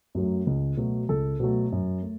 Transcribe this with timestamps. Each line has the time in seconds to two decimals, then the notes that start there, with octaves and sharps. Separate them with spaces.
0.15 F#2 F#3 A3
0.47 C#2
0.77 B2 F#3 A3
1.09 C#2 A4
1.40 B2 F#3 A3
1.72 F#2
2.03 A3